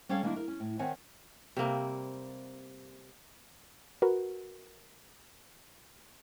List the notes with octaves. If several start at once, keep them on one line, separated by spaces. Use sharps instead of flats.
G3 C#4 A4 C#5 F5
D#3 G3 A#3 C4 D4 E4
A#4
C#4
A2
D#3 C4 C#5 E5 F#5 G#5
C3 G3 A#3 C4
F#4 A#4 B4